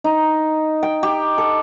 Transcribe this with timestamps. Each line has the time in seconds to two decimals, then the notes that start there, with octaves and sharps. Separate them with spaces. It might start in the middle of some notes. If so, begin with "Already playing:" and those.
0.04 D#4
0.83 G5
1.03 G4
1.38 A4